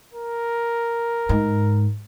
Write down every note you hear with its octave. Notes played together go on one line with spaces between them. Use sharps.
A#4
G#2